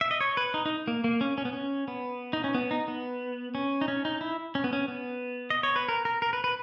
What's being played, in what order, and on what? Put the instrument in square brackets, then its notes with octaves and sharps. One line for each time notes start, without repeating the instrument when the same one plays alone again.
[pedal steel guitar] E5
D#5
C#5
B4
D#4
D#4
A#3
A#3
C#4
C#4
B3
C#4
B3
D#4
C#4
B3
D#4
B3
C#4
D#4
C#4
D#4
E4
C#4
B3
C#4
B3
D#5
C#5
B4
A#4
A#4
A#4
B4
B4